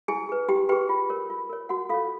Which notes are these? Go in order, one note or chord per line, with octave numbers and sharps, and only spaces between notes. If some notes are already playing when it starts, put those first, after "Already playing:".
E4 G#4 G#5
G#4 B4
E4 G4 G5
G4 G#4 B4 G5
F4
A#4 C#5
F4
A#4 C#5
F#4 F#5
F4 A4 C#5 F5